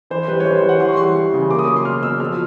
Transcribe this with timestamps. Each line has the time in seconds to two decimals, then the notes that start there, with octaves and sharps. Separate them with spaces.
0.10 E3 C5
0.28 G3 B4
0.40 C#5
0.45 E3 C5
0.57 C5
0.63 G3
0.69 F#5
0.80 E3 C6
0.89 C#6
0.97 G3 C6
1.15 E3
1.33 C#3
1.51 A#3 D6
1.59 D#6
1.67 F#3 D6
1.76 C6
1.85 B2 F6
2.03 B2 E6
2.20 F3 F6